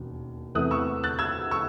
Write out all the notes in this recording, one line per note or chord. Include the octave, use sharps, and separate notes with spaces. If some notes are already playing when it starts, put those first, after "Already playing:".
Already playing: E1 D#2 C#4
E2 C3 E3 A3 D#6 F#6
C#6 E6
F#6 A6
E6 G#6
C#6 E6